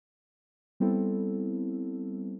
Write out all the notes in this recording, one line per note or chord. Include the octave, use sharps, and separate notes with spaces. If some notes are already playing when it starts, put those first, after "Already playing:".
G3 B3 C4 E4 A4